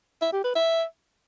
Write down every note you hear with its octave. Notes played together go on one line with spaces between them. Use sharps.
E5
G4
B4
E5